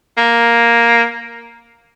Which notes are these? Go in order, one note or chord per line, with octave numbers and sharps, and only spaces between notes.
A#3